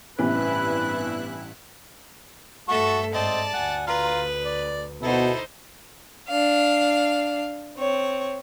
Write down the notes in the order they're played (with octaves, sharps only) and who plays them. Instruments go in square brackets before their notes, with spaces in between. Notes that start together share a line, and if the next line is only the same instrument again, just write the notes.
[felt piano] A1 [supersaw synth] G2 E4 F#6 [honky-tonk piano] C3 E3 B3 [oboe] B4
[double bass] G2 A3 [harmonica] F#4 A5 C#6 [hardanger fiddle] A4 E5
[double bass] G#2 [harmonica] C4 D#5 [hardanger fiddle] D5 A5
[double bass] D2 [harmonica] F#5 G#5
[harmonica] F4 F5 A#5 [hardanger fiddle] B4
[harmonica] D5
[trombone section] B2 [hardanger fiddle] D#4 C5 [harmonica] E4 A4
[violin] D4 F5
C4 C#5